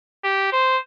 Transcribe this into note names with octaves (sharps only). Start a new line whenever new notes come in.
G4
C5